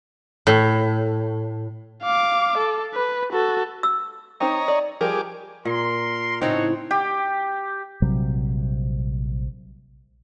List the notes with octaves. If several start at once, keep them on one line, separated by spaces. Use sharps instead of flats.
A2
F5 D6
A4
B4
F#4 A4
E6
C4 D#4 C5 C#5 D#5 A#5
D5
F3 G3 G4 G#4 A#4 D6
A#2 A#4 C6
A2 C#3 C4 D#4 E4 F#4 C#5
G4
A#1 C3 F#3 G3